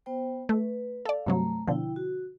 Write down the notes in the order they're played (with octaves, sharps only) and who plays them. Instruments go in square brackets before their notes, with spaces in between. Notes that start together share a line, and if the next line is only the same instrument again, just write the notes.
[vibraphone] B3 C5 G5
[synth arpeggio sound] A3 [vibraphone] B4
[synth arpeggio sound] A4 D5 [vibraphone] F5
[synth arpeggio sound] G2 C3 F#3 [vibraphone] A3 A#5
[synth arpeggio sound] B2 D3 F3 [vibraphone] E4 G5
[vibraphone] F#4